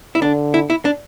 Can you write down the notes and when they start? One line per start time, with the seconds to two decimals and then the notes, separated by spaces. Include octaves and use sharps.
0.15 E4
0.22 D3 D4
0.54 E4
0.70 E4
0.85 D4